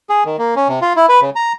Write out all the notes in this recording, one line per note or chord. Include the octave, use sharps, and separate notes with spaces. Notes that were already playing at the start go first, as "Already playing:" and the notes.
G#4
D#3
A#3
C#4
C3
F4
E4
B4
C#3
A#5